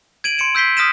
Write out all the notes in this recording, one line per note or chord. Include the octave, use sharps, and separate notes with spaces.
G#6 D7 D#7 F#7
C6 C#7 D7 E7
E6 G6 B6 C7 G7
D#6 F6 A#6 B6 D#7 E7